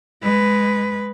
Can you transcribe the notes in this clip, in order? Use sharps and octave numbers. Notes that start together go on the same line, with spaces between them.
G#3 B4